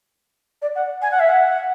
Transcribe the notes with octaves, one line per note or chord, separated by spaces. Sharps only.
D5
F#5
G#5
F#5
E5
F#5